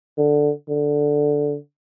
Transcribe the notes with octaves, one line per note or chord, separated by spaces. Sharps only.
D3
D3